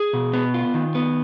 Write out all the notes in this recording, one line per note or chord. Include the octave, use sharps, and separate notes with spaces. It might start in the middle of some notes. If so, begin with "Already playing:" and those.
Already playing: G#4
B2
B3
F4
D#3
B3